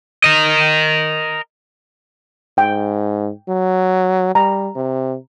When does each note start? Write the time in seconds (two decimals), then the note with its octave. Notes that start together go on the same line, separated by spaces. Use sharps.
0.24 A#4 D#5
2.58 G#2 G5
3.49 F#3
4.35 G3 A#5
4.75 C3